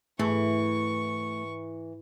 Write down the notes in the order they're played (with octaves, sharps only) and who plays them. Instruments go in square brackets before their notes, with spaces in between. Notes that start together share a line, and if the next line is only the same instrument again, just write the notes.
[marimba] G#2 [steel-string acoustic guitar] E3 [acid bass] A3 [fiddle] C#6